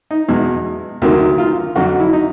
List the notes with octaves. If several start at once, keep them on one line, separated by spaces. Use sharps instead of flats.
D#4
E2 B2 G#3
D2 C3 D#3 F#3 A#3
F4
F2 D3 F#3 F#4
E4
D#4